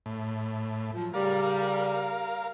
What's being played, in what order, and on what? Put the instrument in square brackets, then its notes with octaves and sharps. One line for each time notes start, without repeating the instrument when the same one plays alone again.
[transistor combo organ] A2
[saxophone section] F3 F#3
[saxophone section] C#3 G3 [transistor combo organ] A#4 F5